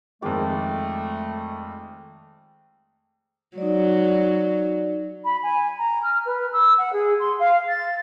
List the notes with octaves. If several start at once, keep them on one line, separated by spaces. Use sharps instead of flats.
F2 D#3 G#3 A3 D5 G5 D6
F#3 D#4 D5
B5
G#5
A#5
F6
B4
E6
F#5
G#4
C6
F5
A6